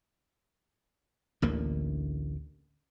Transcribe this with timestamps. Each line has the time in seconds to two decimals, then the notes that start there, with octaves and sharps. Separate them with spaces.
1.42 A1 D2 D3 A#3